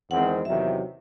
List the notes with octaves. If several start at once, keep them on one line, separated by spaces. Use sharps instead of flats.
E2 D#3 G#3 C4 F#5
E2 C3 D#3 F#3 E5